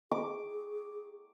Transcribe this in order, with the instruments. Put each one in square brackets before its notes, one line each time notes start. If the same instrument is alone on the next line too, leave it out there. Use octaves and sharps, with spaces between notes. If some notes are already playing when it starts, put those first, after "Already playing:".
[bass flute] G#4 [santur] D6